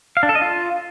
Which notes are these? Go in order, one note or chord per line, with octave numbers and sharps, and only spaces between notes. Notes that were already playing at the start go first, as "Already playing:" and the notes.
F5
D4
A4
D#5
F4